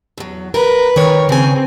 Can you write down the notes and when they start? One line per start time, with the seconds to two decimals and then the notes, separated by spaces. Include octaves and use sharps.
0.18 E2 F#3
0.54 A#4 B4
0.96 D#3 A#4 C#5
1.29 C#3 C4 G#5